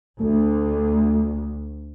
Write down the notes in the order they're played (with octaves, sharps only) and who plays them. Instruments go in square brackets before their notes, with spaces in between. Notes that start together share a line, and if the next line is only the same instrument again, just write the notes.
[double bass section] D2 [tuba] A3